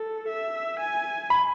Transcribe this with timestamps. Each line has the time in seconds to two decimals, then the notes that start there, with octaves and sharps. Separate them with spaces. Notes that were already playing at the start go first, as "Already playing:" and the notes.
Already playing: A4
0.29 E5
0.80 G#5
1.30 B5